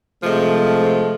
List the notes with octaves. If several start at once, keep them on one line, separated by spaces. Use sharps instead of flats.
C3 F3 G#3 A3